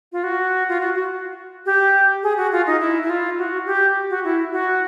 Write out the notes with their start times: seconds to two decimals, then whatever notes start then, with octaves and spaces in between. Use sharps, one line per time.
0.12 F4
0.24 F#4
0.69 F4
0.80 F#4
0.94 F#4
1.66 G4
2.23 G#4
2.37 F#4
2.52 F4
2.67 D#4
2.80 E4
3.02 E4
3.10 F4
3.38 F#4
3.66 G4
4.10 F#4
4.24 E4
4.52 F#4